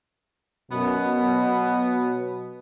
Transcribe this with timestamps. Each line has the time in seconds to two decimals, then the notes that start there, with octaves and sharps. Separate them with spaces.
0.71 F#2 B2 B3
1.22 F#3